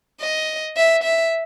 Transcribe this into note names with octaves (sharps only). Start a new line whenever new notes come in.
D#5
E5
E5